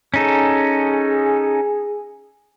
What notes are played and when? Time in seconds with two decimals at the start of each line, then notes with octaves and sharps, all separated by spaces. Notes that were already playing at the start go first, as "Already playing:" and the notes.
0.14 C#4 D#4 G#4 A4